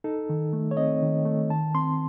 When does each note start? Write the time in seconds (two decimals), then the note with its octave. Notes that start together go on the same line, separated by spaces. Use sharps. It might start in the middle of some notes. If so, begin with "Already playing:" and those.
0.04 D#4 A4
0.29 D#3
0.53 A3
0.71 C#5
0.77 C4 D#5
1.02 D#3
1.25 A3
1.50 D#3 A5
1.74 C4 C6